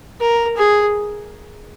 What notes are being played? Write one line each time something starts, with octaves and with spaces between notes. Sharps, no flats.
A#4
G#4